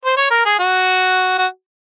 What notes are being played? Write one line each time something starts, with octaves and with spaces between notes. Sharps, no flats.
C5
C#5
A#4
G#4
F#4
F#4